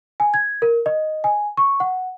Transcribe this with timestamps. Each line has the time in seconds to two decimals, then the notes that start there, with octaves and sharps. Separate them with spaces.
0.20 G#5
0.34 G#6
0.62 A#4
0.86 D#5
1.24 G#5
1.57 C#6
1.80 F#5